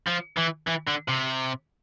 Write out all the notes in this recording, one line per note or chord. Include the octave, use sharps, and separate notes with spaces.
F3
E3
E3
D3
C3